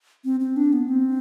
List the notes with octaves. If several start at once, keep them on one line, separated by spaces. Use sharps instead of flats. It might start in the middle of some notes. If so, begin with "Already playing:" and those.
C4
C4
D4
B3
C4